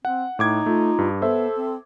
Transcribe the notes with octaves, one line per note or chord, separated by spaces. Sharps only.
C4 F#5
A2 D#4 D6 G#6
A3 F4
G2
B3 A4 C5 E5
C4